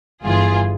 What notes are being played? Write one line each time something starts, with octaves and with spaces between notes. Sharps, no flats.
G1 G2 E3 F4 G#4